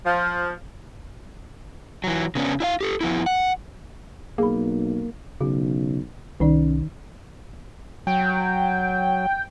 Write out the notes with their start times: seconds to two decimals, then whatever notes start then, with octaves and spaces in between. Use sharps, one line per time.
0.05 F3
2.04 E3 F#3
2.35 C#3 B3 C#4 D4
2.60 E4 D5 F5
2.81 G4 A4
3.01 F3 B3 E4
3.26 F#5
4.38 B1 A#3 G#4 B5
5.41 B1 C#3 F#4
6.40 C2 D#3 C#4 D#4 D5
8.07 F#3 G5